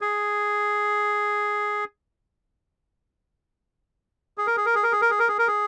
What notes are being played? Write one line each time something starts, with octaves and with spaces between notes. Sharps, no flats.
G#4
G#4
A#4
G#4
A#4
G#4
A#4
G#4
A#4
G#4
A#4
G#4
A#4
G#4